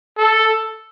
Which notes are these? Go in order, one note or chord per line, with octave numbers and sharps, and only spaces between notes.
A4